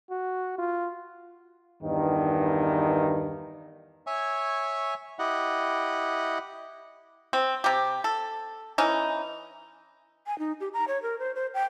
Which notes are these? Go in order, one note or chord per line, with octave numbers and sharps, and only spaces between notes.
F#4
F4
E2 G2 D#3
C#5 E5 G#5 C#6
E4 G4 D#5 F#5
C4
C3 G4
A4
E3 C#4 D#4
G#5
D#4
G4
A#5
C#5
A#4
C5
C5
G5